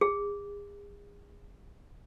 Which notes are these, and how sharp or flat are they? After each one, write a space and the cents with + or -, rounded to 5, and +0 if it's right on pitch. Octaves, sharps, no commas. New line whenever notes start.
G#4 -35